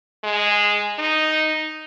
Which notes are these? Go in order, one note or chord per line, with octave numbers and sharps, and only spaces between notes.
G#3
D#4